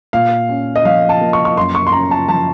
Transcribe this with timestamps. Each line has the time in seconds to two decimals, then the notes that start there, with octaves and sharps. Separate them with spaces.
0.13 A#2 F5
0.49 C#4
0.76 D#5
0.85 F3 F5
1.09 A5
1.21 A#3
1.33 C#6
1.45 C#6
1.57 F#2 C6
1.75 C#6
1.87 C6
1.92 C#4 A#5
2.11 A5
2.29 F3 A5